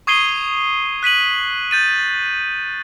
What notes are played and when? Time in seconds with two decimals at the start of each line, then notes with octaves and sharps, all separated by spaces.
0.07 C#6 D#6 G#6 C7 D#7 G7
1.03 F#6 B6 D#7 F#7
1.71 G6 A6 D#7